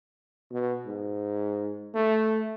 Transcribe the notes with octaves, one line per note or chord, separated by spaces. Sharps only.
B2
G#2
A3